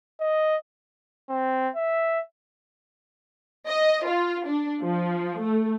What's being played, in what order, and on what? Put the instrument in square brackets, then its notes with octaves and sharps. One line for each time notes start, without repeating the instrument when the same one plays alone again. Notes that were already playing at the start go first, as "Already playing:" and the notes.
[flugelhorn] D#5
C4
E5
[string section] D#5
F4
D4
F3
A3